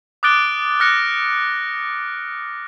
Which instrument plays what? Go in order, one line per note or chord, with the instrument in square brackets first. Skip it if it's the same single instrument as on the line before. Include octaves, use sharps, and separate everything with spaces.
[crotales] D6 D#6 F#6 A6 D7 G7
F6 F#6 A#6 C#7